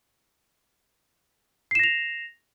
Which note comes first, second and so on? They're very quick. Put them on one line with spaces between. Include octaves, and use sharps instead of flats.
C7 E7 A#6 F7